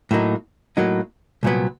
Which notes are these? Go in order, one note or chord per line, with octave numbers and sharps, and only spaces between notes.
A2 F#3 A#3 D#4
A2 F#3 A#3 D#4
C2 A#2 F#3 B3